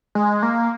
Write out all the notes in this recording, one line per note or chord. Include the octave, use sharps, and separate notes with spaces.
G#3
A#3